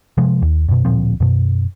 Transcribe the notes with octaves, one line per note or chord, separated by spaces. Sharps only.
C3 F3 G#3
D#2
F#2 B2
D1 A#2 F3 C4
F#2 B2